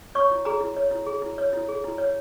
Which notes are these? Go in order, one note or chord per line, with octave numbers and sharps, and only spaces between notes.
C#5 C#6
E4
G#4 A#5
E4
C#5
E4
G#4
E4
C#5
E4
G#4
E4
C#5